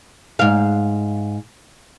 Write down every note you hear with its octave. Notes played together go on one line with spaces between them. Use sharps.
G#2 F5